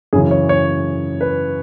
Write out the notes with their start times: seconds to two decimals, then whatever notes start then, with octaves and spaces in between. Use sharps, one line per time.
0.13 F#2 C#3 E3 G#4
0.31 C#5
0.49 C#5
1.21 B4